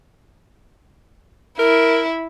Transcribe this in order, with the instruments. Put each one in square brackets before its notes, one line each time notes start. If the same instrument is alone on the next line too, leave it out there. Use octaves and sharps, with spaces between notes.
[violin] E4 [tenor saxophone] A#4